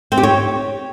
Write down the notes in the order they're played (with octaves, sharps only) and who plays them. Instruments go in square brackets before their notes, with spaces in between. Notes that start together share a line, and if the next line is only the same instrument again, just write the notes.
[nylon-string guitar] C4
G4
C#5